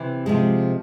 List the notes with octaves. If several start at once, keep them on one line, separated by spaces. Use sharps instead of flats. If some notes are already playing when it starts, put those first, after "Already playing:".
Already playing: C3 E3
C3 F3 G#3